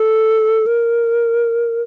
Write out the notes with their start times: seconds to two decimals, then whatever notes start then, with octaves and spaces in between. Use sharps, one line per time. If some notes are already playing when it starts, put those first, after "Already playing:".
Already playing: A4
0.66 A#4